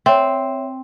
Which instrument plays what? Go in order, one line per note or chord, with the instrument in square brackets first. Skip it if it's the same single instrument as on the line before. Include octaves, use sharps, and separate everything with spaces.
[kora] C4 [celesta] C#5 E5